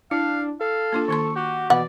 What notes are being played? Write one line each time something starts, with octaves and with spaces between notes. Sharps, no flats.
D4 E4 F5
A4 F5
A#3 D4 F4
D#3 A#3 C6 C#6
F#4 G4
B2 E3 B4 D5 F#5 B5